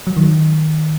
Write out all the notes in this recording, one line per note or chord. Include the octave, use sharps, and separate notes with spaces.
F#3
D#3